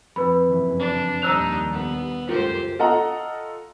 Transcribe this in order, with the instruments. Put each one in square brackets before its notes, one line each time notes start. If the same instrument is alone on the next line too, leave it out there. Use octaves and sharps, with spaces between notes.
[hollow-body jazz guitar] F2 [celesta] B4 B5
[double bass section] F#1 C#3 E3
[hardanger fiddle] D4
[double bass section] D#2 A#2 G3 [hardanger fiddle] D4 D#4 [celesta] E6 F#6 F7
[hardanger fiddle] B3
[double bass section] C#2 F#2 [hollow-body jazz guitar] F4 A4 A#4 [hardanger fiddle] G4 C5
[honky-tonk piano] F4 A4 D#5 F#5 A#5